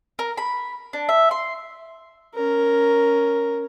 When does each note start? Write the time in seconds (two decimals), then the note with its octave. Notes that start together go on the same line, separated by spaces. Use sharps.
0.19 A#4
0.38 B5
0.93 D4
1.09 E5
1.31 C6
2.35 C#4 A#4